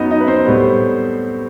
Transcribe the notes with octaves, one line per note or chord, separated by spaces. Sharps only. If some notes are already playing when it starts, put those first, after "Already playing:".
Already playing: F#2 F#3 B3 D#4 D#5
D#4 D#5
B4
C4 C5
A2 G3 B3